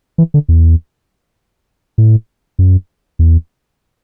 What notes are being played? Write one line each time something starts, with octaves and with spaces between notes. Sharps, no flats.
E3
D3
E2
A2
F#2
E2